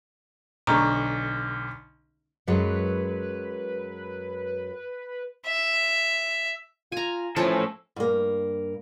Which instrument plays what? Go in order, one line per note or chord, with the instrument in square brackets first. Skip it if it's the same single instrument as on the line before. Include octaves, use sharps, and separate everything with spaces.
[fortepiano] B1 D3 [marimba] A#5 C#6
[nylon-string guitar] F#2 F#3 G#3 [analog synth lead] B4
[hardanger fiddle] E5
[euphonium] F4 [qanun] G#5 A#5
[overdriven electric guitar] A2 A4 [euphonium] E3 [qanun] F3 C#4
[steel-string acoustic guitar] G2 A#3